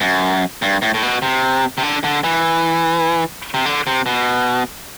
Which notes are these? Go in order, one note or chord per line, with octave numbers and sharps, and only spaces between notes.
F#2
G2
A2
A2
B2
C3
C3
D3
D3
E3
C3
D3
C3
B2